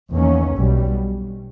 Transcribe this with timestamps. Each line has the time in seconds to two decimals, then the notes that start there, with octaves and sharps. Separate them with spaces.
0.13 E2 D#3 A#3 C#4
0.56 B1 B2 G3